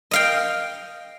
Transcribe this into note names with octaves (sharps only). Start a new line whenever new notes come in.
D#5 F5 G5